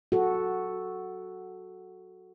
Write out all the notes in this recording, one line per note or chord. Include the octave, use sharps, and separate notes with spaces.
F#4 A4